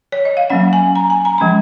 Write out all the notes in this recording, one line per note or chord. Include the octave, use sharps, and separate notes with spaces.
C#5
D#5
F5
F#3 A#3 C#4 F#5
G#5
A#5
G#5
A#5
F3 G#3 C#4 B5